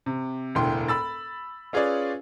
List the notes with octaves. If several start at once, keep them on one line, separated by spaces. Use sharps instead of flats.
C3
E1 D2 A2 G5 C6
B5 E6 A6
C#4 F4 G#4 B4 C#5 D5